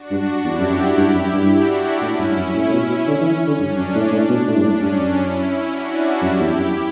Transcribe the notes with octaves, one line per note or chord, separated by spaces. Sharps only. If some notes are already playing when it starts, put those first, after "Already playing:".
Already playing: D4 F#4
G2
E2 E4 G4
F#2
F#2
G2
F#2
G2
D4 F#4
A2 C#4 E4
G2
F#2
A2
A2
B2
B2
D3 C#4
E3
E3
D3
G2 D4
F#2
A2
A2 D4
B2
A2
G2
A2 C#4
G2
F#2
C#4 E4
D4 F#4
F#2 E4 G4
E2
F#2